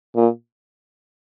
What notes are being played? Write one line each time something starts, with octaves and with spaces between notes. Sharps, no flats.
A#2